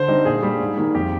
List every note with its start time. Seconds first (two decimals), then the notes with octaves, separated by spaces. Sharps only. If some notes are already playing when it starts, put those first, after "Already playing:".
Already playing: D3 C5
0.08 G3 C4 D#4
0.25 A#2 G#4
0.43 G3 D4
0.60 G#2
0.78 D#3 G3 A#3
0.95 F2 G4